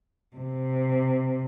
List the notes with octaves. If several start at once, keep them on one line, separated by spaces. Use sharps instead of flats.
C3